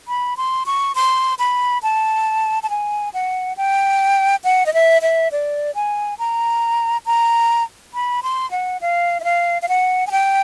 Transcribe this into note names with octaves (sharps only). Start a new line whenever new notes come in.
B5
C6
C#6
C6
B5
A5
A5
G#5
F#5
G5
F#5
D#5
E5
E5
D5
G#5
A#5
A#5
B5
C6
F#5
F5
E5
F5
F5
F#5
G#5
G5